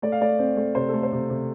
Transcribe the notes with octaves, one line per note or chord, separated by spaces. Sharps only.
A3 D5
F5
A3 D5
C4
A3
C3 C5
A3 A4
C5
C3
C3